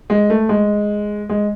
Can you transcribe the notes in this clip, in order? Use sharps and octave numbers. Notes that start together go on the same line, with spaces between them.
G#3
A3
G#3
G#3